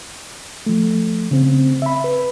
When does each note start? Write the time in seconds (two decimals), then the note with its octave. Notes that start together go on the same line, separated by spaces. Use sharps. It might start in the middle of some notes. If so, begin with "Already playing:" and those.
0.66 F3 A3
1.31 C#3 C4
1.82 E5 B5
2.04 B4